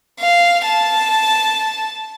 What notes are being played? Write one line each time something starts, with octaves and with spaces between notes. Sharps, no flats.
F5
A5